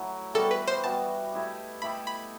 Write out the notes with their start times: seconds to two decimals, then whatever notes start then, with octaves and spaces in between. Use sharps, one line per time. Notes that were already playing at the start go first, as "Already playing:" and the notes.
Already playing: F#3 A3 E4
0.34 E3 G3 B3 F#4 A4
0.51 B4
0.68 C5
0.84 E3 G3 B3 F#4 A5
1.33 A3 E4 G4 D#5
1.82 A3 E4 G4 D#5 B5
2.07 B5